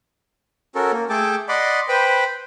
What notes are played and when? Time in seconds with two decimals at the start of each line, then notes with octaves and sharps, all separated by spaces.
0.75 C#4 F#4 A4 A#4
0.92 A#3
1.10 A3 G#4 A4 G5 A5 D6
1.49 D5 D#5 F#5 B5 C6 D6
1.88 B4 C5 G5 B5